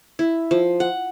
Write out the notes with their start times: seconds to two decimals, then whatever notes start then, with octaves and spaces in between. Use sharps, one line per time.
0.19 E4
0.51 F3
0.80 F#5